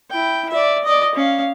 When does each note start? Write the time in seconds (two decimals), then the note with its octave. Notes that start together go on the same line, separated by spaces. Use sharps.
0.10 E4 G5
0.50 D5 E5
0.84 D5 D#5
1.15 C#4 F5